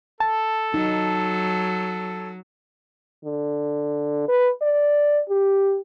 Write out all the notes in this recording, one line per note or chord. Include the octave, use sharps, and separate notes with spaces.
A4 A5
F#3 D#4
D3
B4
D5
G4